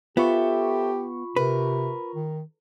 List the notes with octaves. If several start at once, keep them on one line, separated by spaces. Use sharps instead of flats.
B3 F4 G4 A4 C5 E5 B5 C#6
C3 A#4 B4
D#3